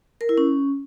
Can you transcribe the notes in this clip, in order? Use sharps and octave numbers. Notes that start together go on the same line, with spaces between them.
A#4
E4
C#4